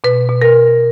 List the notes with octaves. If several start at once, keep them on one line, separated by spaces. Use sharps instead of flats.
B2 B4
B2
A#4